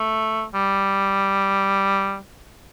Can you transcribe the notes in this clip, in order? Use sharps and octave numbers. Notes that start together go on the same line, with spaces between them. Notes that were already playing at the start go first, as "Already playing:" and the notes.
Already playing: A3
G3